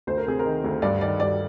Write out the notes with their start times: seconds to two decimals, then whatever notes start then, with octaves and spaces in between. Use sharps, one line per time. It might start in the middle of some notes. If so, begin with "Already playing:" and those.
0.07 D2 C5
0.18 A#4
0.26 C3 G#4
0.39 A#4
0.45 D#3
0.64 D2
0.82 G2 D5
1.01 D#3 D5
1.20 G2 D5